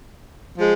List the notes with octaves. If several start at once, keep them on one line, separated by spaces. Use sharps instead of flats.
F3 G#3